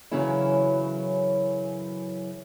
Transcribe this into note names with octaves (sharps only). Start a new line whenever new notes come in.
F#2 C#3 E3 F#3 C#4 E4